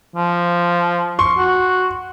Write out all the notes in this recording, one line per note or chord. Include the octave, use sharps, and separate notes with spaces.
F3
C6 C#6
F#4